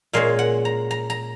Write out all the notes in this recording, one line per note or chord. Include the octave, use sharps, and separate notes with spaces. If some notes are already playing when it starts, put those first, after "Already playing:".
A#2 G#3 C#4 F5
F#5
A#5
A#5
A#5